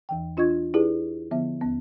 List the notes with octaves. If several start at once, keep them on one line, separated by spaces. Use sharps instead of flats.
E2 E3 G5
D4 F4 D#5 C#6 G#6
D#4 E4 G4 G#4 B4 D5
D3 F3 B3 E5
D#2 B3